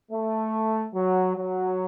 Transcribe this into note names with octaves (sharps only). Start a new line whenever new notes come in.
A3
F#3
F#3